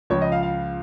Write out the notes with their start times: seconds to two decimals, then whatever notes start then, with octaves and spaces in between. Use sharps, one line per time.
0.10 C#2 C#3 F3 C#5
0.21 D#5
0.32 F5
0.43 F5